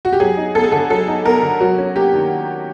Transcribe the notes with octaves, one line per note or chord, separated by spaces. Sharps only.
F#4
G4
F#3 G#4
D#4
B3 A4
G#4
D3 A4
F#3 A4
D#4
B3 A#4
D3
F#3 F#4
C#4
A#3 G4
D#3